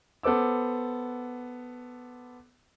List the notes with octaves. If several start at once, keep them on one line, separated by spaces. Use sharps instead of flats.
B3 A4 C5 D6 E6